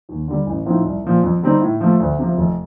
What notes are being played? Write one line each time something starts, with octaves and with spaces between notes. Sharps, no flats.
D#2
D3 G3
A1
A2 F3 C4 D#4
C2
A#2 F3
F2
D3 G3 C4 D#4
A2
F3 A3
D2
C3 F3
F1